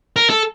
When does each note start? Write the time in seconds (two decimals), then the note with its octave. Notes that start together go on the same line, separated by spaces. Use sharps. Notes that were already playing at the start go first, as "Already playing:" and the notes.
0.16 A#4
0.30 A4